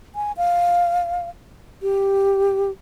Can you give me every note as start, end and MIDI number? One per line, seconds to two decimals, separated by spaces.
0.15 0.32 80
0.37 1.29 77
1.82 2.71 67